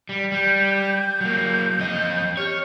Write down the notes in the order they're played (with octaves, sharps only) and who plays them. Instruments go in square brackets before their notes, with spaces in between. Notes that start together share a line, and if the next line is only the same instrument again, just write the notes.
[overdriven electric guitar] G3
[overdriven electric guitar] G3 [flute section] G6
[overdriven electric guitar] F#3 A#3
F2 D#5
[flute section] G4 F6 [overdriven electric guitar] C#5